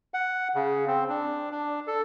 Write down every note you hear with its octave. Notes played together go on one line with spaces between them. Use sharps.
F#5
C#3
C4
D4
D4
A4